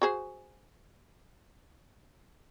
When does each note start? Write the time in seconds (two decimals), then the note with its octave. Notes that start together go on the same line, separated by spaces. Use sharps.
0.02 F#4 G#4 C5